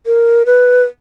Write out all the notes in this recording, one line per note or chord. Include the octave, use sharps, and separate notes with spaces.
A#4
B4